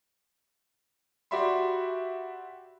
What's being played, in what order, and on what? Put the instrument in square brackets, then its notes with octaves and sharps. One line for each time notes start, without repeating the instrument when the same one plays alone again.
[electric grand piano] F#4 G4 D5 E5 B5 C6